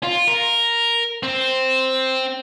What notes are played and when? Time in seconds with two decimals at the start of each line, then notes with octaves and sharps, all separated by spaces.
0.03 F4
0.27 A#4
1.23 C4